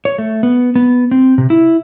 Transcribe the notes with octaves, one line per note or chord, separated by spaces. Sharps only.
C#5
A3
B3
B3
C4
C3
E4